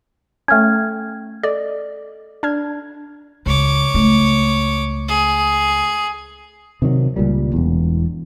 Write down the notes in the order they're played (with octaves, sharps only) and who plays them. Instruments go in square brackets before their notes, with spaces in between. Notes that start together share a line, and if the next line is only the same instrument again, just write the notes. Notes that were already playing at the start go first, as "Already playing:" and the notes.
[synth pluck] A3 C#4 [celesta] G5 F6 G#6
[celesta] A4 [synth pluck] D5 D#5
[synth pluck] D4 F6 G#6
[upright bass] C#2 [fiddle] C#5 D6
[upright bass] C#2 A3
[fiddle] G#4
[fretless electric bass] C3 D#3 F#3
C#2 A#2 G3
E1 E2